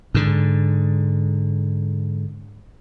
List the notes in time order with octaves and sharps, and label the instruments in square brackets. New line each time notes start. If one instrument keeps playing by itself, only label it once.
[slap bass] G#2 D3